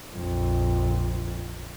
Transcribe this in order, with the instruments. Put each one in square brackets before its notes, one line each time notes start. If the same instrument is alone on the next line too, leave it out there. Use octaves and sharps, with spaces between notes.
[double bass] A#1 F2